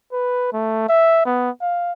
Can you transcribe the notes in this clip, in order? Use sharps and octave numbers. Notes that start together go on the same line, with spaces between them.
B4
A3
E5
B3
F5